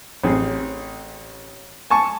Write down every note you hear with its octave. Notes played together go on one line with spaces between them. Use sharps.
A1 C4 G#4
G#5 A5 C#6